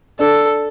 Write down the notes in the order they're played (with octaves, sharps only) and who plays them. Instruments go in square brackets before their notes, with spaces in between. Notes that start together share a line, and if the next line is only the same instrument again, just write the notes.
[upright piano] D4 [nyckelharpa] A4